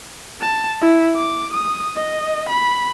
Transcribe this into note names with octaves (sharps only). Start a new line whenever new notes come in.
A5
E4
D6
D#6
D#5
B5